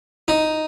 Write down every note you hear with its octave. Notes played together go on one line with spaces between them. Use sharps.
D#4